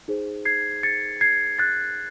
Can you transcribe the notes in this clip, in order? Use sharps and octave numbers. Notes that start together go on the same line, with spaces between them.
D#4 G#4 C5
G#6 C7
A6 C#7
G#6 C7
F#6 A6